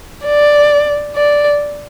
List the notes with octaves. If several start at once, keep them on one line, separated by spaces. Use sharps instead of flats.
D5
D5